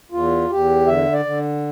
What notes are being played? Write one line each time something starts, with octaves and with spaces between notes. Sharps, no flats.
E2 F4
E2 G4
D3 E5
D5
D3